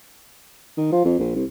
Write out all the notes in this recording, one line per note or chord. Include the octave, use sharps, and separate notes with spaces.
D#3
F3
F2
A#1
C2